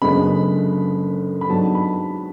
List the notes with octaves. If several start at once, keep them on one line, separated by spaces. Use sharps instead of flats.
F#1 F#2 D3 G#3 B3 B5
B5
G#2 F#3 B3 D4 A5
B5